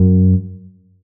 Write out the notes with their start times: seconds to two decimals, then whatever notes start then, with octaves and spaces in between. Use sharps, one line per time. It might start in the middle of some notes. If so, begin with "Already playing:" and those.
Already playing: F#2